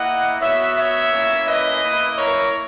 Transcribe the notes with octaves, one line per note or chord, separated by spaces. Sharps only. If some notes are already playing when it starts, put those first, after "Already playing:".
Already playing: A#3 E4 D#5 F#5
B3 F#4 C#5 E5
C#5 E5
A#3 C#4 E4
B4 D#5
A#3 E4
A#4 C#5